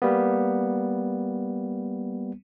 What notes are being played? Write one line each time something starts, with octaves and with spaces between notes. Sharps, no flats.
G3 A#3 B3